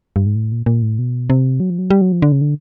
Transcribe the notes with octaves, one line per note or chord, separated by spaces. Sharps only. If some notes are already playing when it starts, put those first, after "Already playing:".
G2
G#2
A2
A#2
A#2
A2
B2
C3
F#3
F3
F#3
G3
F#3
F3
D3
C#3
D3